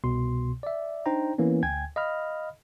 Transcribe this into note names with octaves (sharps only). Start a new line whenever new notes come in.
C2 B2 C6
D5 E5
D4 D#4 C5 G5 A#5
E3 A#3 B3 C#4
D2 G5 G#5 G#6
D#5 F5 B5 F6